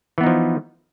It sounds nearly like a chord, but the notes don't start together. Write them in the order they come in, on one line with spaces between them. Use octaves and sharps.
E3 B3 D#4 F3